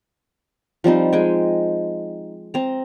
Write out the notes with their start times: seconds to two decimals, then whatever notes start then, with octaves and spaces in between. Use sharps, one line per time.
0.84 F3 G3 C4 D#4
1.13 G#3 G5 G#5
2.54 C4 A#5